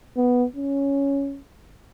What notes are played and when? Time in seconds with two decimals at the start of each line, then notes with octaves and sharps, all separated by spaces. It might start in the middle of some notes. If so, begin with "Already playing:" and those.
0.17 B3
0.56 C#4